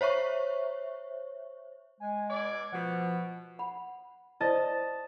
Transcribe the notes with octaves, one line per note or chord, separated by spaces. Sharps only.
C5 C#5 E5 C#6
G#3 G#5
B2 D5 G#6
B2 F3 F#5
F#5 B5
E4 C5 D5 D#5 A5 A6